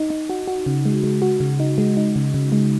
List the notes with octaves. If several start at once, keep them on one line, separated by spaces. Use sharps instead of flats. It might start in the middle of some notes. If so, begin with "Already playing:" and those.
Already playing: D#4
D#4
F#4
F#4
C#3
G#3
G#3
F#4
C#3
D#4
G#3
D#4
C#3
C#3
G#3